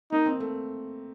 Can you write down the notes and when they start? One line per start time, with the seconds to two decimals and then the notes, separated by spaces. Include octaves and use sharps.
0.12 A#3 D#4
0.26 C4
0.40 A3